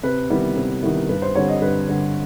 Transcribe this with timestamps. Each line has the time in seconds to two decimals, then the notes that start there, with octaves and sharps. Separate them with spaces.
0.03 C3 B4
0.30 D#3 G3 B3 E4
0.57 C3
0.83 D#3 G3 B3 E4
1.09 G2 B4
1.22 C5
1.35 D3 G3 C4 C#5
1.49 D#5
1.62 G2 B4
1.88 D3 G3 C4